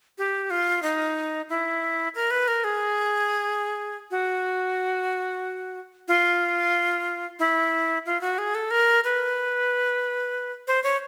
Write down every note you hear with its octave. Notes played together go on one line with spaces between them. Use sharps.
G4
F4
D#4
E4
A#4
B4
A#4
G#4
F#4
F4
E4
F4
F#4
G#4
A4
A#4
B4
C5
C#5